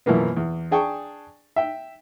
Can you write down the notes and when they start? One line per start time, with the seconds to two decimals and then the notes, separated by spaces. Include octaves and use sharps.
0.06 F#2 B2 E3 F3 A#3 B3
0.37 E2
0.71 D4 G#4 G5 A5 C#6
1.56 E5 G5